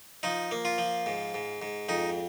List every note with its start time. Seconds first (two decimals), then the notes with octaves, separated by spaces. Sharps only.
0.23 F3 D#4
0.51 A#3
0.65 F4
0.78 F3
1.06 G#2
1.34 G#2
1.62 G#2
1.89 F2 D#4